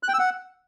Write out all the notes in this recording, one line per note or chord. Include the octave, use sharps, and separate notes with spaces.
F#6
G5
E6
F#5